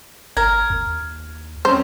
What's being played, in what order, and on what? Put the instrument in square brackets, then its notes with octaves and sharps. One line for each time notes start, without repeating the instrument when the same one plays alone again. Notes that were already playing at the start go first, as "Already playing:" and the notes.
[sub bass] G1 [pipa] A#4 [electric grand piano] G#6
[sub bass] D#2
[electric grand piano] G3 C4 C#4 [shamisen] C5